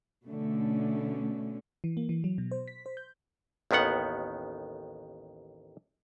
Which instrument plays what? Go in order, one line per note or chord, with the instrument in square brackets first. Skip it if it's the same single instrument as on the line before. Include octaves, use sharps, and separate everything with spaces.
[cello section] B2 D3 A3 C#4
[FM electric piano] E3
A#3
E3
F#3
B2
C5
B6
C5
G6
[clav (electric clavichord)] A1 D#2 D#3 B3 F#5